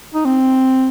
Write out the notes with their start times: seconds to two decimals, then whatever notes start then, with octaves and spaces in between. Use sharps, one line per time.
0.14 D#4
0.25 C4